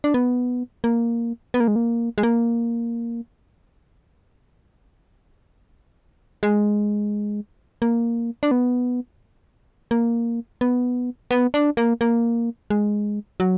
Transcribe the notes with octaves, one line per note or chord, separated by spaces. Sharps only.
D4
B3
A#3
B3
A#3
G#3
A#3
G#3
A#3
G#3
A#3
D4
B3
A#3
B3
B3
D4
A#3
A#3
G#3
F#3